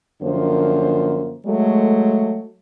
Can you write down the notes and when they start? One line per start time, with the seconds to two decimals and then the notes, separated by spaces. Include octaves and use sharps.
0.22 F#2 D3 F3 A#3 C5
1.46 F#3 G#3 A3